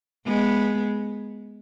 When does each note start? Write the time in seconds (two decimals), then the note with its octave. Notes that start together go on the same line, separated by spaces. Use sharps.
0.26 G#3 B3